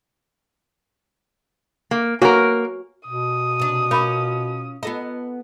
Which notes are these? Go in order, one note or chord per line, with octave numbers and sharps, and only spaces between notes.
A#3
A#3 F#4 A#4 C#5 G#5
B2 D#6
C3 D4
C#4 F4 A#4 C#5 B5 D6
B3 F4 A4 D#5 A#5